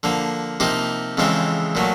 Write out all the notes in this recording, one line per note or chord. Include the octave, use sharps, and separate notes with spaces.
D3 F3 A#3
C3 F3 A#3 D#4 G4
F2 C#3 E3 G#3 C4
A#2 F#3 A3